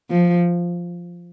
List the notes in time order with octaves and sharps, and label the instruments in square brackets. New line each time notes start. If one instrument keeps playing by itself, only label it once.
[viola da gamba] F3